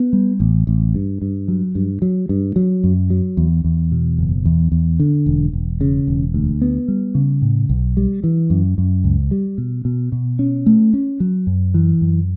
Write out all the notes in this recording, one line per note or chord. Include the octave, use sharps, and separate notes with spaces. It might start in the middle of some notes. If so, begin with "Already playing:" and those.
Already playing: B3
G3
A1
A1
G2
G2
F#3
G2
F#3
G2
F#3
F#2
F#3
E2
E2
B2
F#1
E2
E2
D3
E1
E1
C#3
E1
D2
B3
G3
C#3
A2
B1
G3
E3
F#2
F#2
C#2
G3
B2
B2
B2
C#4
A3
C#4
F#3
F#2
E3
F#2